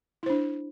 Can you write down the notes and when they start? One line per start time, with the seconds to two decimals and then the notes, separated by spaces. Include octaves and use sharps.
0.23 E4
0.26 C5
0.30 D4